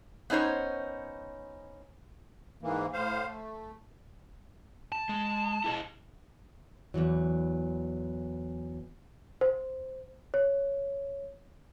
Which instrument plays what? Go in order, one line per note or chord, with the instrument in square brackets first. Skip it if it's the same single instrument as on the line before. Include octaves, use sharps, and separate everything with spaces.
[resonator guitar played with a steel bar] B3 C#4 D#4 C5 C#5
[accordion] G#2 E3 A#3
A2 C5 F5
A3
[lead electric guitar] A5
[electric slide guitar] G#3
E4 G#4 D#5
[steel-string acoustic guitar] E2 C3 E3 F#3
[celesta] C5
C#5